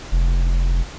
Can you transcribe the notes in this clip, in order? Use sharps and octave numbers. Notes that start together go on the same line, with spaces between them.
F1